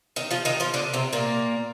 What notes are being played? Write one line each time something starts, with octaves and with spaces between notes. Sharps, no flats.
D#3 D#4
F3 F4
D#3 D#4
F3 F4
D3 D4
C3 C4
A#2 A#3